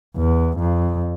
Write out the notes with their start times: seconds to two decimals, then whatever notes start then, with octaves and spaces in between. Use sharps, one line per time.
0.17 E2
0.57 F2